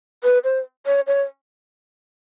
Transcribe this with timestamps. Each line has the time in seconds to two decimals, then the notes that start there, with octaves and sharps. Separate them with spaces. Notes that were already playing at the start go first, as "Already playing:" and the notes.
0.24 B4
0.44 C5
0.86 C#5
1.07 C#5